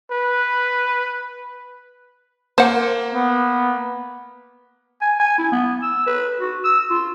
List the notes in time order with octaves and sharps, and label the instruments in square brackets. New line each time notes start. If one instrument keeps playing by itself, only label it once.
[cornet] B4
[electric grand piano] A#3 [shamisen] C5 F#5
[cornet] B3
[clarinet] G#5
G#5
E4
B3
E6
B4
F#4
E6
F4